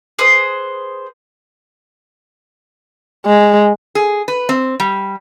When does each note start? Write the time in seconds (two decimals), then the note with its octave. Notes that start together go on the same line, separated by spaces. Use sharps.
0.19 G#4 B4 C5 D#6
3.26 G#3
3.95 G#4
4.28 B4
4.49 C4
4.80 G3